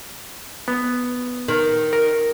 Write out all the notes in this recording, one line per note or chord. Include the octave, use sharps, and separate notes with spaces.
B3
D#3
A#4